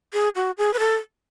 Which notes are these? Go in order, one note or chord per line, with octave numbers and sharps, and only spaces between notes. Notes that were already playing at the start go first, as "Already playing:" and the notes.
G#4
F#4
G#4
B4
A4